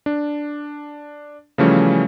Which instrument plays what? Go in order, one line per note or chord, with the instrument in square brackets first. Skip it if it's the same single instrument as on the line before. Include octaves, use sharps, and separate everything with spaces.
[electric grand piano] D4
C#3 E3 F3 G3 A3 C#4